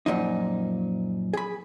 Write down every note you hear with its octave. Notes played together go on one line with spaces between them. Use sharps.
F#2 A#2 F3 D#4
G#4 B5